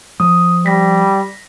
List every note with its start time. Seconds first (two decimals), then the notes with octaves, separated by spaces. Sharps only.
0.20 F3 D#6
0.66 G3 A#6 B6